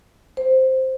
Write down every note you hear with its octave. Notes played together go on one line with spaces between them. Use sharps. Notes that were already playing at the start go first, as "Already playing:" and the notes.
C5